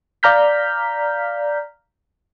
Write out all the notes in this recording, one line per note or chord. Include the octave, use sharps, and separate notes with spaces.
D5 F5 A#5 F6 G6 B6